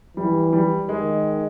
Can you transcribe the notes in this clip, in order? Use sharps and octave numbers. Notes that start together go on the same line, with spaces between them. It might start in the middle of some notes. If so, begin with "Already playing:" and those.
E3 G3
G3
D#3 G#3